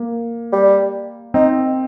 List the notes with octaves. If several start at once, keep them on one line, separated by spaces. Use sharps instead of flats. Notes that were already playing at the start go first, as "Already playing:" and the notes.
Already playing: A#3
G3
C4 D#4